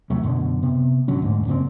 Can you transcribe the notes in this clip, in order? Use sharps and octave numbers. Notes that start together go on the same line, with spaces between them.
D#2 C3 F#3 A3
F#2 B2 D3
C3 B3
G1 D3 F#3 C#4
D#1 D2 G#2
F#2 C#3 A#3 C4